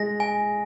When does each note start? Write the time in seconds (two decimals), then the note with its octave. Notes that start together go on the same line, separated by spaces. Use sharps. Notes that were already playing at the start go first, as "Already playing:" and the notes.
Already playing: G#3 A#6
0.20 G#5